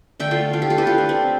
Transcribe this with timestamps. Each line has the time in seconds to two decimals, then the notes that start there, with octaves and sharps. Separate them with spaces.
0.20 D3 A3 E5 G5
0.31 F4 A4
0.53 D4 F4
0.62 E4 G4
0.70 F4 A4
0.78 G4 B4
0.87 F4 A4
0.98 D4
1.09 C4